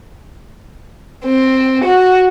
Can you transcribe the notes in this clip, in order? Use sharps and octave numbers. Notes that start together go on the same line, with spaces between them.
C4
F#4